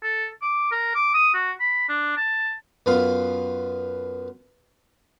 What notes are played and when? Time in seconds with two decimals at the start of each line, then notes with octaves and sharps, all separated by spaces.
0.03 A4
0.42 D6
0.72 A#4
0.95 D6
1.14 D#6
1.34 F#4
1.60 B5
1.89 D4
2.17 A5
2.86 F#2 B3 F4 F5 C6